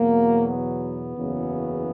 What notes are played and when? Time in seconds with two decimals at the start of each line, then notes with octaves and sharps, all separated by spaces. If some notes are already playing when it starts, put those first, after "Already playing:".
Already playing: E2 B2 F#3 A#3
0.48 B3
1.17 F#1 E2 C#3 F#3